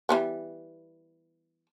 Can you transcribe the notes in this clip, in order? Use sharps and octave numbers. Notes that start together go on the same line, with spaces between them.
E3 G3 B3